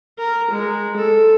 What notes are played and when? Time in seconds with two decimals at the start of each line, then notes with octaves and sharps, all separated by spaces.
0.18 A#4
0.51 G#3
0.97 A4